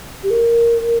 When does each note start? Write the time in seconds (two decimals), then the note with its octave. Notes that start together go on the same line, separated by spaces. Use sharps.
0.23 G4
0.30 A#4